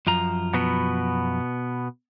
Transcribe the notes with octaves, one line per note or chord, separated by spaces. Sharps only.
F#2 F3 A#5
B2 B3